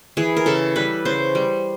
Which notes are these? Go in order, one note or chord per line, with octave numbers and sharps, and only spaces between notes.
E3 G#4
A#4
C#3 A4
G3 B4
C#3 C5
G3